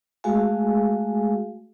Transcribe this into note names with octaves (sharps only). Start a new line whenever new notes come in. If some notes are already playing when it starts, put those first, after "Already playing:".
G#3 A3 F#4 G#4 F5 G#5